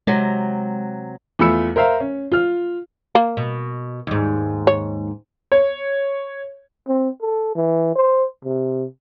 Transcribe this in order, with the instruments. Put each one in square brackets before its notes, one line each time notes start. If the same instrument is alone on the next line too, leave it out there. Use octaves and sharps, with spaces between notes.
[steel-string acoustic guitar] C3 F#3 [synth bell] G#3
[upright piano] E2 A3 F4 B5 E6 C#7
A#4 C5 E5 F5 A#5
C#4
F4 F6
[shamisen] A#3
[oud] B2
D#2 G#2
[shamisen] C#5
[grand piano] C#5
[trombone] C4
A4
E3
C5
C3